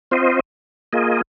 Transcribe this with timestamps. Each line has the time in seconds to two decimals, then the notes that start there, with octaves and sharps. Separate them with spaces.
0.11 C4 F4 C5 D#5
0.93 A#3 F4 G#4 D#5